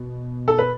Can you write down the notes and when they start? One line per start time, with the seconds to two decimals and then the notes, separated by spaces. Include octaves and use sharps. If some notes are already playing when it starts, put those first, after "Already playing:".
Already playing: B2
0.48 A4
0.58 B4